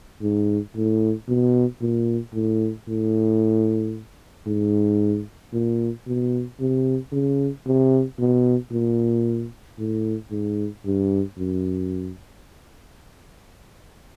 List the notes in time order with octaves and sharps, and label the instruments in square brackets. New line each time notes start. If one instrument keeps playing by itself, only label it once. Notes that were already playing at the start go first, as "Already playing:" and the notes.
[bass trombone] G#2
A2
B2
A#2
A2
A2
G#2
A#2
B2
C3
C#3
C3
B2
A#2
A2
G#2
G2
F#2